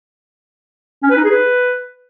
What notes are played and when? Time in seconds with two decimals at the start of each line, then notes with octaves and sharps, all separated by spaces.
1.03 C#4
1.10 B4
1.17 D#4
1.24 G#4
1.31 B4